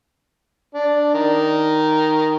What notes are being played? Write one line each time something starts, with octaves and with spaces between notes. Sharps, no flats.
D4
D#3